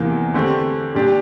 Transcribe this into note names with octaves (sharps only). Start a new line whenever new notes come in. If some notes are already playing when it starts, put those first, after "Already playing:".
Already playing: E2 C3 E3 A#3
D3 A3 C4 G4
A#2 G3 D4 G4